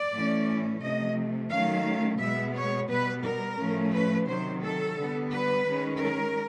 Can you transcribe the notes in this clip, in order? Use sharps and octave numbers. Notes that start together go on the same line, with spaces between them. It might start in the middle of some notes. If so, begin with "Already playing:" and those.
Already playing: D5
A2 E3 A3 C#4
C3 F3 A3 D#5
D#3 F#3 A3 C#4 F5
B2 G#3 B3 E5
C#5
B2 G3 B3 B4
A#4
A2 F3 A3 C#4
B4
C3 D#3 F#3 C5
A4
D3 G3 B3
B4
D#3 G#3 C#4
A#4